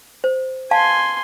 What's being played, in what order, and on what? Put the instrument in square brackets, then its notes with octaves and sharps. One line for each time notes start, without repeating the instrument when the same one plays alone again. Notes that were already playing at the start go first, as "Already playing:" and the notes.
[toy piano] C5
[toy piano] F5 A5 [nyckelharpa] G#5 C6